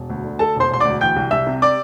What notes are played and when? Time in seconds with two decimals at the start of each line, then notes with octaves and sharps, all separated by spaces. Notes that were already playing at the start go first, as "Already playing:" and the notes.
Already playing: E1
0.10 D2
0.24 D3
0.39 A3 A4 A5
0.56 E1 C5 C6
0.71 E1 C6
0.80 D2 D5 D6
1.01 E3 G5 G6
1.16 C2
1.31 C2 E5 E6
1.47 C3
1.62 D5 D6